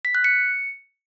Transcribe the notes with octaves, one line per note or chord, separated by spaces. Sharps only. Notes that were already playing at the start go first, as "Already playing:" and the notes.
B6
F#6
C#7